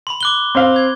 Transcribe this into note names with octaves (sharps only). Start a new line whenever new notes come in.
B5 C6
D6 F#6 G7
C4 C5 F5
G#6